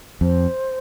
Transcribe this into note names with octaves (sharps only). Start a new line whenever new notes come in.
F2 C5